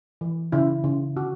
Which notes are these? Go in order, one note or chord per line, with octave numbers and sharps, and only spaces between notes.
E3
C#3 E4
C#3
D3 F#4